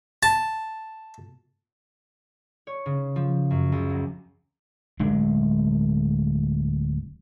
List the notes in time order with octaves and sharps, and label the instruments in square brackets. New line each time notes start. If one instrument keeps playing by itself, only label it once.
[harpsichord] A5
[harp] C#5
C#3
F3
F#2
C#2
F#3
[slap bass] D1 G#3 D4